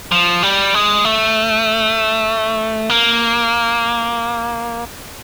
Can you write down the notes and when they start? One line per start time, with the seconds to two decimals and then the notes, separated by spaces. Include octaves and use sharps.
0.12 F3
0.43 G3
0.74 G#3
1.05 A3
2.90 A#3